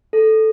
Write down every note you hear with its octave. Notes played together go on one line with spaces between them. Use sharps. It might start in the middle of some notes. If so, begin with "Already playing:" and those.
A4